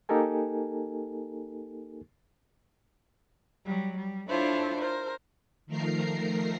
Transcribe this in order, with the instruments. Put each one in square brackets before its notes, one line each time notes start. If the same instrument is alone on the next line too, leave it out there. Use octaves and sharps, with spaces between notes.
[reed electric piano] A#3 D#4 G4 A4 A#4 G#5
[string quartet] F#3 G3
G3
D4 E4 F4 A4 C5 C#5
A#4 C5
[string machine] D#3 F3 A3 A#4 A#5 C7